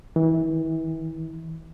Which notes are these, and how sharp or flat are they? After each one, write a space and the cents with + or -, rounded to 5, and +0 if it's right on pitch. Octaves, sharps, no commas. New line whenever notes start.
E3 -30